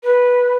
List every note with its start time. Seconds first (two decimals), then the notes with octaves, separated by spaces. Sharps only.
0.03 B4